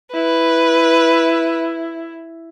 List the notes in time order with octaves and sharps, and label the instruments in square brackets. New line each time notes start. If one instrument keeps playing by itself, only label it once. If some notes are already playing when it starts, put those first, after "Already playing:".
[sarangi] E4 [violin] B4